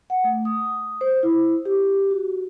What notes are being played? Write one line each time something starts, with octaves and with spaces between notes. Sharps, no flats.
F#5
A3
D#6
C5
E4
G4
F#4